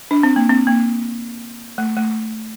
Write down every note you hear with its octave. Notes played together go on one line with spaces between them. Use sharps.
D4
C4
A#3
C4
A#3
A3
A3